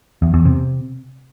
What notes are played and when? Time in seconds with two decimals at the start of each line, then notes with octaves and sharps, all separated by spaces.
0.22 E2
0.34 E2
0.45 C3